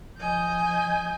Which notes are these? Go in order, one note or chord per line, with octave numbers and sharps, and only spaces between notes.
F3 D#5 G#5 G6